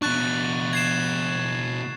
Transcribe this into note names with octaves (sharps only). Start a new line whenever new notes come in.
B2 D4 C#6 F#6 A6
G#6 C7 E7